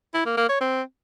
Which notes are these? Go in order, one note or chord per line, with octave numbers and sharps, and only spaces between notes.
E4
A#3
A#3
C#5
C4